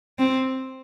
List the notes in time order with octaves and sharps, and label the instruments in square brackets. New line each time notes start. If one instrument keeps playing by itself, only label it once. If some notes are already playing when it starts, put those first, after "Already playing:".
[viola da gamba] C4